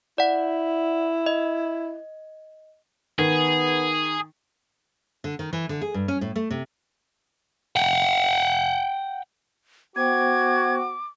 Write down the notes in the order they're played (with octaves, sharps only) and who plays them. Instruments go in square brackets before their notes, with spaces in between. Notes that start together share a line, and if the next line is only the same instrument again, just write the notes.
[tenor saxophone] E4 [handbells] D5 F#5
[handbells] D#5
[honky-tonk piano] D#3 [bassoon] B3 [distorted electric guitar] G#4
[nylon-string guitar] D3
D#3
E3
D3
G#4
G2
C#4
A2
A3
C3
[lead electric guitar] F#5 G5
[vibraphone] B3 C5 G5 [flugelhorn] F#4 [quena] D6 [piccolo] G#6